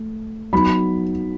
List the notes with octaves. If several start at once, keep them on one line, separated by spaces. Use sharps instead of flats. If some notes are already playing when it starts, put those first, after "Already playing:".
Already playing: A3
F#3 B3 D#4 B5